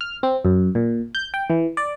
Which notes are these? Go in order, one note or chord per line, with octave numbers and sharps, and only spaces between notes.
F6
C4
F#2
A#2
G6
G5
E3
D5